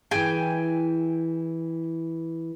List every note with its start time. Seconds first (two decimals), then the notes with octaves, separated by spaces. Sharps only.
0.11 E3 E4 G#4 G5 G#5